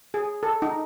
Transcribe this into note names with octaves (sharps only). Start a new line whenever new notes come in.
G#4
A4
D#4